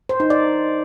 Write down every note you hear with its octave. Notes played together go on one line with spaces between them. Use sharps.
C5
D#4
D5